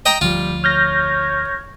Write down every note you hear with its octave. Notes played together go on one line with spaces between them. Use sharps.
D#5 G5 A#5
D2 F3 G3 F4
C#5 F6 G6 A#6